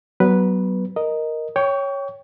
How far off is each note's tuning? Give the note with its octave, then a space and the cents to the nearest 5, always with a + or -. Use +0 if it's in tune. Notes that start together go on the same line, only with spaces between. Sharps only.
F#3 +30 B3 +0 B4 -5
A#4 +0 D#5 +0
C#5 +0 G5 +0 C#6 +30